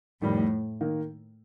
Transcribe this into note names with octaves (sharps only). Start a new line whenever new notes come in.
F2 A2 D#3 G3
D#3 A#3